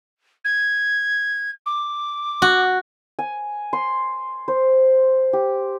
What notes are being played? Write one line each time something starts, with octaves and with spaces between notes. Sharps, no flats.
G#6
D6
F#4
G#5
C6
C5
G4